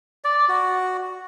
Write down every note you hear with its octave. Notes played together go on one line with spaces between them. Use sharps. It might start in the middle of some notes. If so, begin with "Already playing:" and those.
D5
F#4